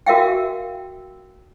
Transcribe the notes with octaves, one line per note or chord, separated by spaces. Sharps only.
F#4 A#4 E5 F5 G5